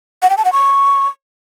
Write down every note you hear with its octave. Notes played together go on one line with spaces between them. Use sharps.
F#5
G5
A5
F#5
C#6